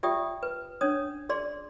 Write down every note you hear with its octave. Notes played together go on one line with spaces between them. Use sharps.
F4 G4 D5 E5 G5 D#6
B4
C#4 D4 C#5 D#6
G#4 D5 C6